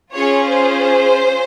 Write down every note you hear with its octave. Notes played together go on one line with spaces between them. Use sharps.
C#4 F4 G#4 C#5
C5